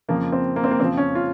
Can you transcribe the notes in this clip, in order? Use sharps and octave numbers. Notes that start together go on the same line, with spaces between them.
F2 C#3 F3 A#3
C4
A#3
C4
A#3
F2 C#3 F3 C4
C#4
F4